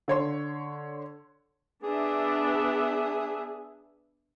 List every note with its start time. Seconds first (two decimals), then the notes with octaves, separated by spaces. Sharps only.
0.08 D3 C#5 C6
1.83 B3 D4 G#4 E5